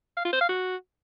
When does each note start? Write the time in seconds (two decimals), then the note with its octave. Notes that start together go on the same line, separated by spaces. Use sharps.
0.17 F5
0.25 F4
0.33 C5
0.41 F5
0.49 F#4